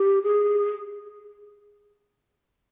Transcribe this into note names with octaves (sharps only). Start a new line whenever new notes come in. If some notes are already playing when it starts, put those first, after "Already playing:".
Already playing: G4
G#4